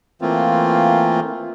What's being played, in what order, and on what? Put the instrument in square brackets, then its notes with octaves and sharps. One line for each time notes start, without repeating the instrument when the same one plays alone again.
[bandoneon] E3 A3 A#3 C4 F4